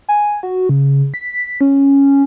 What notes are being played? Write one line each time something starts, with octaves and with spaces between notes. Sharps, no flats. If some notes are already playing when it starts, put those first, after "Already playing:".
G#5
F#4
C#3
B6
C#4